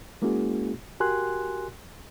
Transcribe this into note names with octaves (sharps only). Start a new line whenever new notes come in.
G#3 A#3 C#4 E4 F#4 G#4
F#4 G4 A#4 G#5 C6 F#6